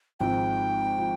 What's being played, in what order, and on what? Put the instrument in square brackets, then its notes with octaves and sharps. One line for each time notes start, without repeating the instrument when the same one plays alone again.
[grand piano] G#1 G#2 F3 C4 [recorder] G5
[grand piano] F3 C4